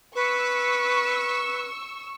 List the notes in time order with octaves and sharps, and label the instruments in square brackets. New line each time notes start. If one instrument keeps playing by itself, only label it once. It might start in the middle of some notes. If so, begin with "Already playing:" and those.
[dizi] B4 [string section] C#6 E6